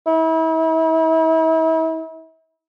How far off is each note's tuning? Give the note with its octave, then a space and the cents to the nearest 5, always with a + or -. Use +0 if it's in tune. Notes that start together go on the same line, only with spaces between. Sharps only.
E4 -40